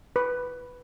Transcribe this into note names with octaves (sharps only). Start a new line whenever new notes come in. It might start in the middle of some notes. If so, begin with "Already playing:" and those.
B4